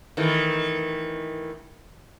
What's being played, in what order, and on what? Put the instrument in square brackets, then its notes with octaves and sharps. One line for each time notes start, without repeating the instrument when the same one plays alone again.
[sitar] D#3 E3 A3